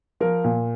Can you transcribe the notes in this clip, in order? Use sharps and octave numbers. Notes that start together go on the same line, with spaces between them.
F3 A#4
A#2